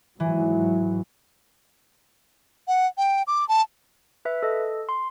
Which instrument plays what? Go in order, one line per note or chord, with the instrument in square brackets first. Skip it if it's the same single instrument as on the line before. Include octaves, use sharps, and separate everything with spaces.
[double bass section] G#2 F#3 [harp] E3
[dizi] F#5
G5
D6
A5
[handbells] B4 E5
A4 D#5
C6